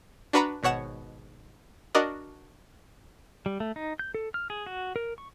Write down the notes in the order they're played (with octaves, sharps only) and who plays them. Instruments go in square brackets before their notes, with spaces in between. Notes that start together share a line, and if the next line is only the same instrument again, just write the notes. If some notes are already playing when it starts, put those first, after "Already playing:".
[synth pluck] D4 F#4 B4 F#5 A#5 B5
G#1 B2 C#5 F#5 E7
D4 F#4 A#4 D5 D#5
[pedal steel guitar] G3
A3
D#4
G6
A4
F6
G#4
F#4
A#4
C#6